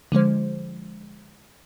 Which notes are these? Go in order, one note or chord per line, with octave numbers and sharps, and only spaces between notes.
D3 F3 G#3 C5